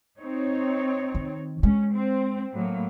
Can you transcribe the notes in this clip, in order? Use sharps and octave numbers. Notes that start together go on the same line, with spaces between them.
C4 D#4 C#5
D#3
G#3 C#4
C4
A2 F#3 A#3